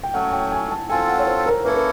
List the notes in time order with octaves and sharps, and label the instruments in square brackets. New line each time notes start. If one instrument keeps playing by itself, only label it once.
[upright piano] G5
[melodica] F#3 A3 C#4 [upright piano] F#5
[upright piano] G5
G#5
A5
[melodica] C4 F4 A4 [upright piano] G#5
[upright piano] F#5
C#5
C5
A#4
[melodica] A#3 C#4 E4 A4 [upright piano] B4
[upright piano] A#4